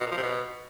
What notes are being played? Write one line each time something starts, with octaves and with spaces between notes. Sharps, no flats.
B2
A#2
F3
C3
B2